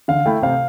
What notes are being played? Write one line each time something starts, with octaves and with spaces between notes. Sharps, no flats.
D3 F5
A3 E4 G5
C3 F5